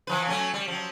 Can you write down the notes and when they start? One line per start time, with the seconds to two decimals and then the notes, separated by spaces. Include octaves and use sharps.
0.07 E3 F3 B4
0.27 F#3 A3 C#4
0.54 G3
0.68 F3 F#3